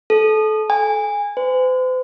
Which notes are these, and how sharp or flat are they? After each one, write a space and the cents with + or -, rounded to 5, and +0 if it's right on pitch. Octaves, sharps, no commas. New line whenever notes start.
A4 -25
G#5 -20
C5 -45